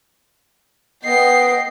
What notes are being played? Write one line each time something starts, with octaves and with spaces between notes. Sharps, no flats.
B3 D#5 G5 C7